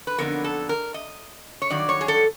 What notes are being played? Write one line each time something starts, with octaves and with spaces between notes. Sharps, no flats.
B4
F2 D3 F#3 B3 D#4 A#4
A4
A#4
D#5
C#5
G2 D#3 F#3 D5
C#5
G#4
A4